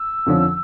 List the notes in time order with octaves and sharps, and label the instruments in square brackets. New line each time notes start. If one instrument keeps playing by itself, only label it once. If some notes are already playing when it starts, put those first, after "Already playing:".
Already playing: [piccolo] E6
[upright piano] F2 D3 F3 C#4